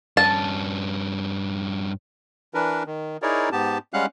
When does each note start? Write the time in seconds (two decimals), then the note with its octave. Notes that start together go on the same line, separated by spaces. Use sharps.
0.17 G2 C#4 A5
2.54 E3 D4 A#4 B4
2.87 D#3
3.22 D#4 E4 G#4 A#4 C#5 D5
3.52 G#2 B3 G4 A5
3.93 G3 G#3 C#4 F5 F#5 F#6